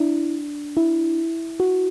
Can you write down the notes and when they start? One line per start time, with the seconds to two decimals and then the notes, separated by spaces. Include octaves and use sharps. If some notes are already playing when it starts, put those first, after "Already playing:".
Already playing: D4 E4
0.77 E4
1.60 F#4